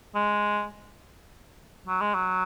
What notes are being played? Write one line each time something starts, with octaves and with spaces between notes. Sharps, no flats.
G#3
F#3
G#3
F#3